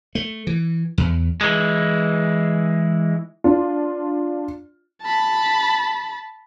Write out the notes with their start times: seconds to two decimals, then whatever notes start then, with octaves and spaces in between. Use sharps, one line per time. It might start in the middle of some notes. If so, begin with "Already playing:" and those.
0.15 A3
0.47 E3
0.98 E2
1.41 E3 G#3
3.44 D4 F4
5.02 A5 B5